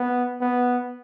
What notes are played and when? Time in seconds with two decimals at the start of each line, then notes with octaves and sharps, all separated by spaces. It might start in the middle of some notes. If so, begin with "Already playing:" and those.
Already playing: B3
0.41 B3